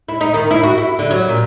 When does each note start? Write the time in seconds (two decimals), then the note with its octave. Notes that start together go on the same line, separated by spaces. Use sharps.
0.09 E4
0.21 D#4
0.34 D#3
0.51 E4
0.63 F#4
0.78 E4
0.99 D3
1.11 F#3
1.28 A#2